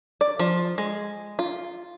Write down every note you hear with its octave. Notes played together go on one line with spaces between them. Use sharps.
D5
F3
G#3
F4